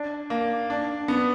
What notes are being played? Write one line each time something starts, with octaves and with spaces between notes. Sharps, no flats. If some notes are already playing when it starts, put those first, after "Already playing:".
Already playing: D4
A#3
D4
B3